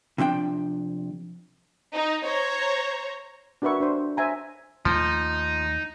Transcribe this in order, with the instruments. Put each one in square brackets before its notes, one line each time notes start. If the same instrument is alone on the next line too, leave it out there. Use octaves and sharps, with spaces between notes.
[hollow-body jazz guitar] C3 F3 D4 G5
[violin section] D#4
C5 C#5 A#5
[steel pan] D4 F#4 A#4 B4 E5 C#6
D4 C5
C5 E5 G#5 A#5
[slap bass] D#2 A3 [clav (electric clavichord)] F3 [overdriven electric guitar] D#4